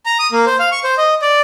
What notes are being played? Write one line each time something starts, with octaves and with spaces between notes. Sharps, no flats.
A#5
D#6
A#3
C5
F5
C#6
C5
D#5
D5